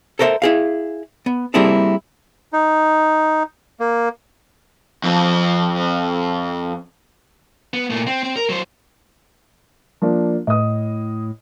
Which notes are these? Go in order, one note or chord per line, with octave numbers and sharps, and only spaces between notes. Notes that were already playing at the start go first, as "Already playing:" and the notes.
A4 A#4 C5 D5 E5
E4 G#4 F5
B3
G3 A#3 C4 E4 G#4 A4
D#4
A#3
F2 C4
B3
A#2 A3
C4
C4
A#4
F#3 C5
F3 A#3 D4
A2 D#5 D#6